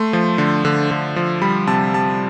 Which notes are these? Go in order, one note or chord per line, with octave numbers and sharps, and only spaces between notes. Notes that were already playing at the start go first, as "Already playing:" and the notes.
Already playing: A3 C6
F3
D3
D3
D3
F3
G3 B5
C3 A5
G3 A5